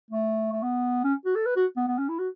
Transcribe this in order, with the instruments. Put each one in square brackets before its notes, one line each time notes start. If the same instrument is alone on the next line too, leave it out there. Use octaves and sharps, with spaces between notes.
[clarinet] A3
A3
B3
C#4
F#4
A4
B4
F#4
B3
B3
C#4
E4
F#4